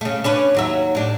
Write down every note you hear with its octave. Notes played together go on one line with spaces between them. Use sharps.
C#3 A3
C#4 D4 B4
D#2 F#3 E5
A2 D4